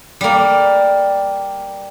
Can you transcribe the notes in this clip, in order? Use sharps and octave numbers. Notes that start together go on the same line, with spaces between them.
G3 A#3